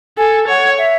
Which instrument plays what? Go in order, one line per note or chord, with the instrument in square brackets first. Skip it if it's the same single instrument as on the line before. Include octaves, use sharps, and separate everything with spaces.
[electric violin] A4 [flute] G#5
[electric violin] C#5 [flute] F#5
[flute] E5